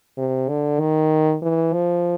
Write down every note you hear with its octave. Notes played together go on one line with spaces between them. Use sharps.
C3
D3
D#3
E3
F3